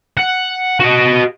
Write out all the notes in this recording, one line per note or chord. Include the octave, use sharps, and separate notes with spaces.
F#5
F#4 D#5